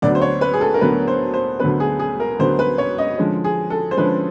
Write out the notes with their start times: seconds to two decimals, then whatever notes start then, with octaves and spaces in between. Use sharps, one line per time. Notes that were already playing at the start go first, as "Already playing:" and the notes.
0.02 D2 D3 F#3 B3 D5
0.15 C5
0.22 C#5
0.41 B4
0.53 G#4
0.61 A4
0.74 A#4
0.81 D2 D3 F#3 B3 B4
1.08 C5
1.34 C5
1.60 D2 D3 F#3 B3 B4
1.80 G#4
1.99 G#4
2.20 A#4
2.39 D2 D3 F#3 B3 C5
2.59 B4
2.78 C#5
2.98 D#5
3.18 D3 F3 G#3 C#4
3.44 G#4
3.70 A4
3.91 C5
3.97 D3 F3 G#3 C#4 B4